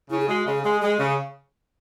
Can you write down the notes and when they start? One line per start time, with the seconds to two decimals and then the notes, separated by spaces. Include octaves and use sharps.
0.10 C#3 E4
0.20 G#4
0.28 G#3 F#4
0.46 C#3 G#4
0.64 G#3 G#4
0.81 G#3 G#4
0.98 C#3 G#4